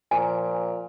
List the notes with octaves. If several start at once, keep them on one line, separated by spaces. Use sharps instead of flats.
A#2 F3 G#5